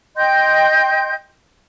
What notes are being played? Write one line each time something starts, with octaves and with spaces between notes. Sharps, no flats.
D#5 G5 C6 G6